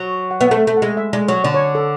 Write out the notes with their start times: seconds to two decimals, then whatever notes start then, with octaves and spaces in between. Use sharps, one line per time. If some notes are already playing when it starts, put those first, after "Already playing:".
Already playing: F#3
0.31 F#5
0.40 B3 E5
0.50 A3 F#5
0.67 A3
0.77 F#5
0.82 G#3 E5
0.97 E5
1.13 G#3 D5
1.28 F#3 C#5
1.44 D3 D5
1.54 C#5
1.75 A4